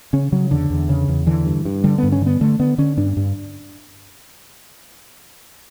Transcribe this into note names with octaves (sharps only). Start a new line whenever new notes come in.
C#3 C#4
C#3 F#3
E2 D3
E2
C#3
E2
D3 E3
G2
G2
D3 G3
G2 B3
C#4
D3 B3
D3 A3
D3 B3
D3 C#4
G2 D4
G2